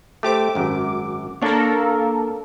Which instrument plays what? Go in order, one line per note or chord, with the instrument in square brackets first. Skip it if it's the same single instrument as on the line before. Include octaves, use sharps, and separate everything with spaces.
[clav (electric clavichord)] A3 G4 C5 [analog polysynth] D6
[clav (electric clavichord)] G#1 F#2
[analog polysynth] A#3 A4 A#4 [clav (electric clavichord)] D4 C#5